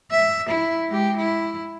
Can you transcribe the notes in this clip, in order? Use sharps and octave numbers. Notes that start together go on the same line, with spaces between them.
E5
E4
G#3 G4
E4